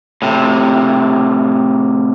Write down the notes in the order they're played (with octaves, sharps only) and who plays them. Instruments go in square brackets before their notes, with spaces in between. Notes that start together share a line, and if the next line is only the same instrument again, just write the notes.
[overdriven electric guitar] A2 C3